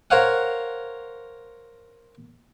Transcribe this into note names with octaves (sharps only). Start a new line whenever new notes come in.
A#4 C5 C#5 F5 F#5